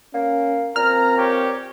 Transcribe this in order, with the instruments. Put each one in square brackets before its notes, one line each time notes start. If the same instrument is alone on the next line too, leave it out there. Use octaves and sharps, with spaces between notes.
[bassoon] A#3 [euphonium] C#4
[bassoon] A#2 [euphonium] C4 [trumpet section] A#5 [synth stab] F6
[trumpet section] G4 C#5